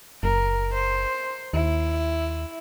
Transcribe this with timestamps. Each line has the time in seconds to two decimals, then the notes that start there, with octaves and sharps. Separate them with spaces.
0.23 F#1 A#4
0.74 C5
1.53 D#2 E4